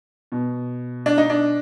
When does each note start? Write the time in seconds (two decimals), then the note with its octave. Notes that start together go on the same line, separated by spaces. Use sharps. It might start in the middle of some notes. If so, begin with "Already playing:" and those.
0.32 B2
1.06 D4
1.18 D#4
1.30 D4